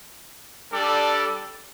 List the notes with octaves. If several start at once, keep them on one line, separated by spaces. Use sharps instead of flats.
G3 D4 A4 D5